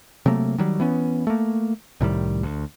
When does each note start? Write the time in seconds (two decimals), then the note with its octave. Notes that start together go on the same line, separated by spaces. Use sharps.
0.26 C3 F#3 A3 A#3
0.58 D#3 F#3 G3
0.80 E3 B3 C#4
1.27 A3 A#3
2.01 C2 A2 D#3 G3
2.43 D2